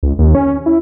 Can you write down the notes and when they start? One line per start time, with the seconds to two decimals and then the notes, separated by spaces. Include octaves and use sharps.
0.03 C#2
0.19 D#2
0.35 C#4
0.66 E4